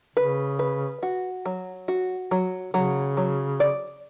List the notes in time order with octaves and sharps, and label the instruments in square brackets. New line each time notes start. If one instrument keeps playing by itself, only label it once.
[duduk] C#3 [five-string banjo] B4
[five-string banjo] B4
F#4
F#3
F#4
F#3
[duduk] C#3 [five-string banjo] F#3
[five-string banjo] F#3
D5